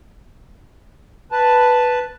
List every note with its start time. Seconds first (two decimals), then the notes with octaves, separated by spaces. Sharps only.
1.32 B4 A5